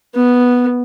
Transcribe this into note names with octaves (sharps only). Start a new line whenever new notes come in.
B3